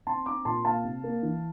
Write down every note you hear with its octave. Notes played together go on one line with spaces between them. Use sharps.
C4 A5 C6
C4 A#5 D6
A#2 A5 C6
A#3 F5 A5
C3
A#3
E3